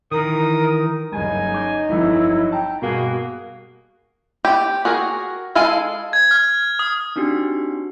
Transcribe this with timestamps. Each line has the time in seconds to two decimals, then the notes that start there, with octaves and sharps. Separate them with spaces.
0.12 D#3 E3 A#4 D#6
1.12 F#1 G2 C#3 D#4 G#5
1.54 D6 G6
1.89 G1 F2 F#3 E4
2.52 G5 A5 A#5
2.82 G2 B2 A#3 F#4 G#4
4.45 G4
4.85 F#4 G#4 A#4
5.55 G#3 A4 F5 G#5
6.13 G#6
6.31 F6
6.79 D#6
7.16 C4 D4 D#4 F#4 G4